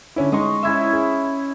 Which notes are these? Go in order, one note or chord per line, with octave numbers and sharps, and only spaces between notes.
D3 C#4 E4
G#3 D#4 D#5 C6 C#6
C#4 E4 E5
G#4